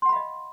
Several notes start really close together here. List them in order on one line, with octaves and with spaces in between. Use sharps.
C6 F#5 B5 F5 D#5